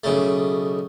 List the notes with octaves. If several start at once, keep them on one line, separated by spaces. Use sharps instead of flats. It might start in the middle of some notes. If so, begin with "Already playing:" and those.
B1 C#3 A3